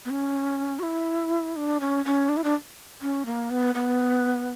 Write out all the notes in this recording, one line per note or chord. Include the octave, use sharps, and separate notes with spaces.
B3
C#4
F#4
E4
D4
C#4
C#4
D4
E4
D4
C#4
A#3
B3
B3